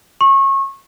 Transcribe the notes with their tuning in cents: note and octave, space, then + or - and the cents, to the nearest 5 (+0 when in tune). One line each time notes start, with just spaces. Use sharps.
C#6 -30